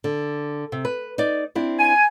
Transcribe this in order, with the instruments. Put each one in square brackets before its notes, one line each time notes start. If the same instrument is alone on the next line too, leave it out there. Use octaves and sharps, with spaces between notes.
[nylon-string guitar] D3
C3
B4
D#4 D5
C4 D4 E4
[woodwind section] G#5